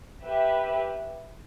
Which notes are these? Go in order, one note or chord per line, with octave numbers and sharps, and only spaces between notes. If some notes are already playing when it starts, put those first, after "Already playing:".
G4 B4 E5